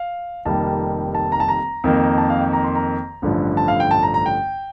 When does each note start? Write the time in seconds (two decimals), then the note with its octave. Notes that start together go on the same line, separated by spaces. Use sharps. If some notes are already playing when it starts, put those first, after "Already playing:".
Already playing: F5
0.45 F1 F2 D#3 G3 A#3 A5
1.15 A5
1.32 A#5
1.40 A5
1.48 A#5
1.84 F2 D#3 A#3
2.18 A5
2.30 F5
2.41 G5
2.53 A#5
2.64 C6
2.75 A#5
3.22 A1 G2 D3 F3 A3
3.57 A5
3.68 F5
3.80 G5
3.91 A5
4.03 A#5
4.14 A#5
4.26 G5